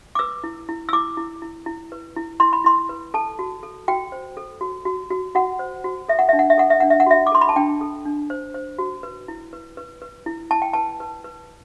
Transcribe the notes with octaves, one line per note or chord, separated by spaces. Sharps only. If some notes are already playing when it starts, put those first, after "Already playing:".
D6
B4 E6
E4
E4
E6
E4 D6
E4
E4
E4
B4
E4
E4 C6
B5
E4 C6
B4
A4 A5
F#4
A4
F#4 G5
C5
A4
F#4
F#4
F#4
F#4 F#5
C5
F#4
A4 E5
F#5
D4 E5
F#5
E5
A4 F#5
E5
D4 F#5
E5
F#5
F#4 E5
D6
A4 C6
B5
A5
D4 G5
A4
D4
C5
C5
F#4
B4
E4
B4
B4
B4
E4
E4 A5
G5
B4 A5
B4
B4